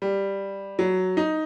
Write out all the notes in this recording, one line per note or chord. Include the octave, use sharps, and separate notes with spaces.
G3
F#3
D#4